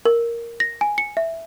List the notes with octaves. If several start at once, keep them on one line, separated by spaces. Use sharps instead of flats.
A#4
A#6
G#5
C#7
E5